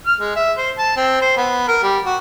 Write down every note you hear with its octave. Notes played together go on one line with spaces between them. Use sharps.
F6
G#3
E5
C5
A5
C4
C5
B3
A#4
G3
F#4